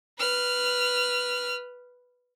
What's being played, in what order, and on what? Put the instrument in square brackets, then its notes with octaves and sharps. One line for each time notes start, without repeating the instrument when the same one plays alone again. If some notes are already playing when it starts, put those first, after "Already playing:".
[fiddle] B4 F6